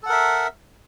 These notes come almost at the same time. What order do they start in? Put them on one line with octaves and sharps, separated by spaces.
A4 F#5 A#4 E5